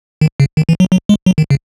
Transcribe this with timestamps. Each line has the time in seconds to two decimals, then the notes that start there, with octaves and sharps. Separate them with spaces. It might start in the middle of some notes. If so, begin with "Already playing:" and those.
0.21 D#3
0.40 C#3
0.57 D#3
0.69 E3
0.80 F#3
0.92 F#3
1.09 G#3
1.26 F#3
1.38 D#3
1.50 C#3